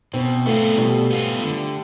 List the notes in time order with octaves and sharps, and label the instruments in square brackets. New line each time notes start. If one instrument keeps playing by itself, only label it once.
[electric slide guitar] B2 [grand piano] C4
[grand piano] A3 [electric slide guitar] B3 F4
[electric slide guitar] B2 [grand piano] G3
[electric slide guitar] B3 F4
D3